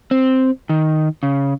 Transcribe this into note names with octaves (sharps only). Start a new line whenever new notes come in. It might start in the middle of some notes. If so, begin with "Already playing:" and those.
C4
D#3
C#3